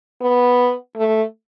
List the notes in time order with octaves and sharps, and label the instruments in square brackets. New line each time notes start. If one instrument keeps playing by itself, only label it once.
[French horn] B3
A3